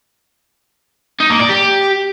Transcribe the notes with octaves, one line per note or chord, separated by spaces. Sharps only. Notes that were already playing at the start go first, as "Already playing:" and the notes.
D#4
A#3
D5
G4